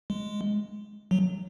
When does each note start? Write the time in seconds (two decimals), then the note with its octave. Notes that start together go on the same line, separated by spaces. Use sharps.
0.10 G#3
1.11 F#3